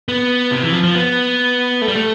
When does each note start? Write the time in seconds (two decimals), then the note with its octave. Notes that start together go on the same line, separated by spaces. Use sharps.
0.08 B3
0.52 C3
0.62 E3
0.73 F3
0.84 F3
0.95 B3
1.82 A3
1.88 G3
1.95 A3